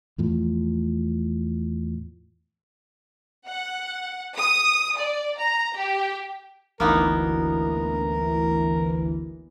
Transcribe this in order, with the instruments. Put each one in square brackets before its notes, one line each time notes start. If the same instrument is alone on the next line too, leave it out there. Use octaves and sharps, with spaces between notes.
[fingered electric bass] E2 A2 F3
[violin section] F#5
D#6
D5
A#5
G4
[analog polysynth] G1 D2 E3 [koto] A#3 B3 D#4 [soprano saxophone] A#4